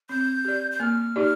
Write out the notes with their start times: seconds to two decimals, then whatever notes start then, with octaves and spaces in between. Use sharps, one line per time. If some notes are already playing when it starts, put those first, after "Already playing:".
0.09 C4 G6
0.45 G4 D5
0.72 G6
0.80 A#3 F6
1.16 D#4 G4 D5